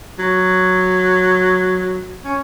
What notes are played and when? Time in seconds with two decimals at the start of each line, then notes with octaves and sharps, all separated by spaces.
0.19 F#3
2.25 C#4